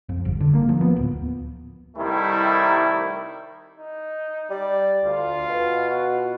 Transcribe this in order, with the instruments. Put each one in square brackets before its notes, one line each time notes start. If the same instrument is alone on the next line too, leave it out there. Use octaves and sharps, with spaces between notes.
[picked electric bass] F2
G1
D3
A#3
F3
B3
D1
[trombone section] C2 D#3 G3 A3 E4
[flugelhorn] D#4
[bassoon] G3 [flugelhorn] D5
[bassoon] D2 [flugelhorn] F4
[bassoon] B2
[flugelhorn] F#4